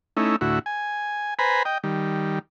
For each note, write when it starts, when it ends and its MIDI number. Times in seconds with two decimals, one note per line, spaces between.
0.17 0.36 57
0.17 0.36 61
0.17 0.36 63
0.17 0.36 64
0.41 0.59 38
0.41 0.59 45
0.41 0.59 64
0.41 0.59 66
0.66 1.34 80
1.39 1.63 71
1.39 1.63 72
1.39 1.63 80
1.39 1.63 82
1.39 1.63 83
1.65 1.78 75
1.65 1.78 79
1.84 2.39 51
1.84 2.39 55